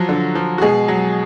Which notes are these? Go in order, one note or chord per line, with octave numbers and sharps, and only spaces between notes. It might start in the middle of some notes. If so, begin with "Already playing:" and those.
Already playing: F3 F#3 F#4
D3
F3
F#4
B2 G#3 G#4
F#3